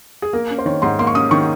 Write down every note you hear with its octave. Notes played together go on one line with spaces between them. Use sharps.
G#4
A#3 A#4
C#4
C5
D#3 C#5
G#2 C6
A#3 C6
C#6
C#4 D#6
D#3 C#6